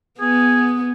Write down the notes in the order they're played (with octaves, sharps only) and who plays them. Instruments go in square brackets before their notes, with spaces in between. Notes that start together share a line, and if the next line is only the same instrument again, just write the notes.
[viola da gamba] B3 [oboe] G#4